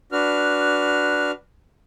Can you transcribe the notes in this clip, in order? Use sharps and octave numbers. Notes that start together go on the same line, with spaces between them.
D4 F#4 B4 F6